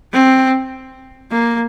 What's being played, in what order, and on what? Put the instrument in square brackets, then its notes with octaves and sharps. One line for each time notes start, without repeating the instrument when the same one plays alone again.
[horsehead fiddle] C4
A#3